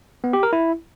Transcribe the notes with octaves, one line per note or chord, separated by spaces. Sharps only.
B3
G4
A#4
E4